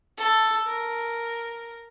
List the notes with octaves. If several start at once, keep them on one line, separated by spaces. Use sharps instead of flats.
A4
A#4